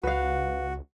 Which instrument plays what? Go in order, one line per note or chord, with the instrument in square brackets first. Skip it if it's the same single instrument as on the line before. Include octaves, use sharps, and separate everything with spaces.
[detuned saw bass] C#2 [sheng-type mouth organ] F#4 [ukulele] B4 F5